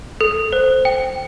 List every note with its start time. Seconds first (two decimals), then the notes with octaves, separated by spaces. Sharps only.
0.21 A4
0.52 C5
0.85 G5